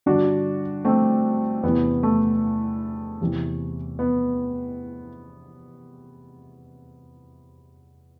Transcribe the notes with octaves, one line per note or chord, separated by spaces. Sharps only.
G2 D3 D4 F#4
A3 C4
E2 C3 E3 B3
A3
E2 C3 E3
B3